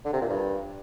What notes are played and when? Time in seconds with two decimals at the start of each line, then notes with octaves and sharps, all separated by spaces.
0.05 D3
0.13 C3
0.21 A#2
0.30 G2